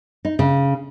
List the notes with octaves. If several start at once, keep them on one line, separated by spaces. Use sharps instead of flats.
D#4
C#3